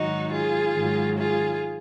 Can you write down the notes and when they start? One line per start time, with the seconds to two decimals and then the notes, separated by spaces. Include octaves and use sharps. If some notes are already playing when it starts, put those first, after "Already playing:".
Already playing: G#2 D#3 F#3 D#4 F#4
0.33 F4 G#4
0.75 G#2 D#3 F#3
1.18 F4 G#4